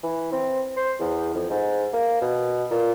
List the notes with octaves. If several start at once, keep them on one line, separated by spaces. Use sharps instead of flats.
E3
C4
C5
E2
F2
G#2
A#3
B2
A#2